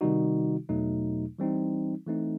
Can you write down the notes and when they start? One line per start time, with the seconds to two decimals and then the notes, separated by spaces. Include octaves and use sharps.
0.01 C3 D#3 G3 D#4 F#4
0.69 E2 B2 F#3 A3 D#4
1.39 E3 G3 C4 D#4
2.07 E3 A3 C4 D#4